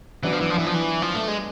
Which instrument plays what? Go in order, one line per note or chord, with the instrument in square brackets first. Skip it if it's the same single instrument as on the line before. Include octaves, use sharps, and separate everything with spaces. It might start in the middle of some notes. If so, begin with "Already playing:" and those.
[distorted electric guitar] E3 [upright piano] F#3 B3 D4
[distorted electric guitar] F3
E3
F3
E3
F3
E3
F3
A3
G#3